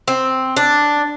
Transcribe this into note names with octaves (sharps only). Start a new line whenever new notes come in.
C4
D4